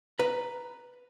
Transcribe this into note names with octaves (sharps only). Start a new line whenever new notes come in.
B4 A#5